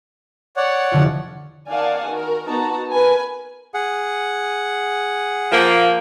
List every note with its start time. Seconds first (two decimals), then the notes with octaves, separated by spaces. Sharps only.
0.57 C#5 D5 F#5
0.92 F1 D3 F4
1.69 D#3 D5 F5 F#5 G#5 A5
2.06 D#3 F#4 A#4
2.46 B3 D#4 F#4 A5 A#5
2.92 A#4 B4 G#5
3.74 G#4 F#5
5.52 F3 A#3